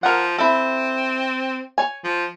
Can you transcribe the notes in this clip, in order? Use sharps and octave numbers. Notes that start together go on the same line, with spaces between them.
F3 A#4 F#5
C4 E4 A4
C#5 G#5
F3